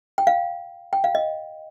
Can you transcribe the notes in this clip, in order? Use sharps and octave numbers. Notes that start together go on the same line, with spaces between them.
G5
F5
G5
F5
D#5